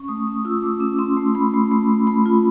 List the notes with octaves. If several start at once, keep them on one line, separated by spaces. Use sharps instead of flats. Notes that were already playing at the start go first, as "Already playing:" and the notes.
Already playing: C#4 C#6
A3 D#6
C#4 D#6
F4 E6
A3 D6
C#4
C#4 C6
A3
A3 B5
A3
A3
A3
A3 B5
F4